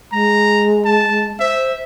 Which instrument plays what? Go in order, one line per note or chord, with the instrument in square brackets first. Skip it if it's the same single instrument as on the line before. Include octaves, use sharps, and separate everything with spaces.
[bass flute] G#3 [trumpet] A#5
[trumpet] A5
[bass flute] C5 [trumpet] E5